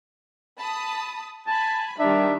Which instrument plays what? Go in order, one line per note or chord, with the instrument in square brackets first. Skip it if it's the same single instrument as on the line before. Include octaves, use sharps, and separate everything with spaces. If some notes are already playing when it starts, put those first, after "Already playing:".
[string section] A5 B5 D#6
[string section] G#5 B5 [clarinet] A5
[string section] D#3 G3 [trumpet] D4 [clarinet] E5